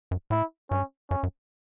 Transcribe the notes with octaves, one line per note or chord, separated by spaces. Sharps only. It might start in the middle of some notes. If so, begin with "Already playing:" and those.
F#2
A2 E4
G2 C#4
F#2 C#4
F#2